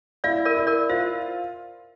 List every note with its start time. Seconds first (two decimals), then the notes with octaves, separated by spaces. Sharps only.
0.24 E4 D5 F5
0.45 A#4 D5
0.57 E4
0.67 A#4 D5
0.89 F4 C5 E5